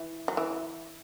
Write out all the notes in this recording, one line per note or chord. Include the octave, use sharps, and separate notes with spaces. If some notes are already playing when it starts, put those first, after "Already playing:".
Already playing: E3
F#3
E3